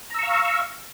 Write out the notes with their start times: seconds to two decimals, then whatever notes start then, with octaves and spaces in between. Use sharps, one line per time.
0.10 A#5
0.14 E6
0.19 C#6
0.23 F5